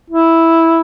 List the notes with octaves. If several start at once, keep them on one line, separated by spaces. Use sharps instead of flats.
E4